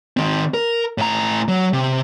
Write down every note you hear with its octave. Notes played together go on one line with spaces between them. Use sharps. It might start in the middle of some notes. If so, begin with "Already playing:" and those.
D#3 C4
A#4
A2 A#5
F#3
C3